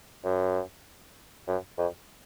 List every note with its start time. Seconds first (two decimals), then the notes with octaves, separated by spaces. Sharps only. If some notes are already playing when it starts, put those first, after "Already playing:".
0.24 F#2
1.48 F#2
1.78 F2